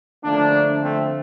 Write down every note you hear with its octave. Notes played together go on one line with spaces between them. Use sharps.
D3 F3 A3 A#3 D4
A3 C4